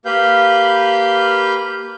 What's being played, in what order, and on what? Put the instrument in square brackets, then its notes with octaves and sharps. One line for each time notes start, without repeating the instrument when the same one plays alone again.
[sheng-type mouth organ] A#3 G4 B4 F5 B5 G6